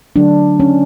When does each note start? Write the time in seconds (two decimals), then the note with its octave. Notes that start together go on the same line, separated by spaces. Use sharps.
0.16 D3 F#3 A3 D4
0.60 C#4